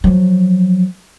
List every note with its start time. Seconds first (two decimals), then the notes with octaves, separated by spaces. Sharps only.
0.04 F3 F#3